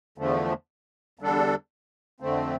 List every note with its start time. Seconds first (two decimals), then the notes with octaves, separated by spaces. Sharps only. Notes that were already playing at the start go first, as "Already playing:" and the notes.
0.18 E2 D3 F3 A3
1.19 E2 D3 G3 D4 A4
2.20 F2 D3 A3 C4